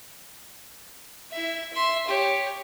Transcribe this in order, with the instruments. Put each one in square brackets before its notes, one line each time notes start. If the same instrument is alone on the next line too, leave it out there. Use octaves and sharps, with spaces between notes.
[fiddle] E4 E5
E5 C6
G4 C#5